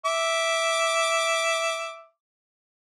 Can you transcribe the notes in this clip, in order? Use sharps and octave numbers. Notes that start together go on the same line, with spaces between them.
E5 D6